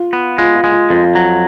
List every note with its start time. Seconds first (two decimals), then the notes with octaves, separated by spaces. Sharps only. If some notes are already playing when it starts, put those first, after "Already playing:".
Already playing: F4
0.13 B3
0.38 G#3 F4
0.55 F4
0.64 G#3
0.72 F4
0.90 F2 F4
1.15 F#3